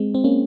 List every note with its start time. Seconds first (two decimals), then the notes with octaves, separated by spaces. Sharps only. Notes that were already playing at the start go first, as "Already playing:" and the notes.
Already playing: G#3 C4
0.15 C4
0.24 A#3 C#4